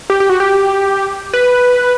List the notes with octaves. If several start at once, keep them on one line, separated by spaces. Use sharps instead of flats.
G4
G4
F#4
G4
B4